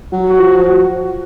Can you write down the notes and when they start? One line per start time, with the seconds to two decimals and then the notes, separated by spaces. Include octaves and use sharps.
0.12 F#3
0.26 F#4
0.39 F3